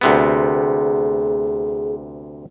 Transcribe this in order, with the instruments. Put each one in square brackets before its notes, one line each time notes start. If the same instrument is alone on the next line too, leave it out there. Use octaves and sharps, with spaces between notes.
[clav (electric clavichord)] D2 C3 B3 [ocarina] G#4